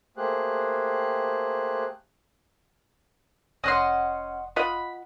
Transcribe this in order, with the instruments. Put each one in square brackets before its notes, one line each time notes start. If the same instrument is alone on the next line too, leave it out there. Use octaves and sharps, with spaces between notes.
[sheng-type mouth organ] A3 A#3 G4 G#4 C5 F#6
[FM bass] F1 [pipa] C#4 [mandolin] D#5 F#5 C6
[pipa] F4 D#5 F#5 [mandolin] B5